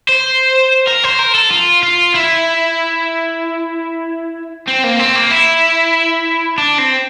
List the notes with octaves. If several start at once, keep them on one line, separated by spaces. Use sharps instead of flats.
C5
A#4
C5
A#4
A4
F4
F4
E4
C4
A#3
C4
A#3
E4
D4
C4